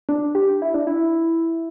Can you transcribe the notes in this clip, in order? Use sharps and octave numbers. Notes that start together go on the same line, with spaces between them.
D4
G4
E4
D4
E4